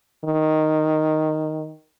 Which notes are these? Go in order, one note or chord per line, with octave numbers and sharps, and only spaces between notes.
D#3